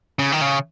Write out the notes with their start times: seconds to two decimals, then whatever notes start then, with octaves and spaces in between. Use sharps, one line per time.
0.19 C#3
0.32 D#3
0.41 C#3